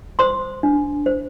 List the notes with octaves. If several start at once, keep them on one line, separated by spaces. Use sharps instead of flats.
C5 C6 D#6
D4
C5